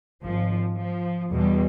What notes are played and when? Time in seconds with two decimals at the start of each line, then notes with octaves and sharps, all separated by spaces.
0.24 G#1 F3
0.75 F3
1.32 E2 B2 G3